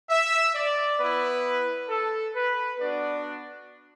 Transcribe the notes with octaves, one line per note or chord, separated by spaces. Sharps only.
E5
D5
B3 E4 B4
A4
B4
B3 D4 F#4 D5